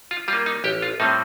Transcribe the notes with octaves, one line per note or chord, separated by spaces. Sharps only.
F4
G3 F4
A#3
D#4
A1 G4
F4
A2 G3 C4 D#4